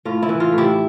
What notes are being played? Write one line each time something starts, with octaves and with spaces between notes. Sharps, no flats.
A2 F4
E4
E3
F4
A2
E4 G4